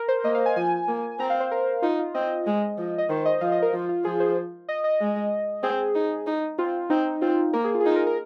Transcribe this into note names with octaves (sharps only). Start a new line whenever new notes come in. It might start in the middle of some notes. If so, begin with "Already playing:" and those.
Already playing: A#4
C5
A#3 D#5
F5
G#5
F3 G#5
A#3
C4 A#5
F5
C5
A#4
D#4 F4
F4
C4 D#5
G#3
F3
D#5
D#3 C5
D#5
F3 F5
D#5
A#4
F3 F4
F4
F3 G#4
C5
D#5
D#5
G#3
C4 G#4
D#4
D#4
C4 F4
C4 D#4
C4 F4
A#3 A#4
G#4
F4
G#4
D#4 F4
A#4
A#4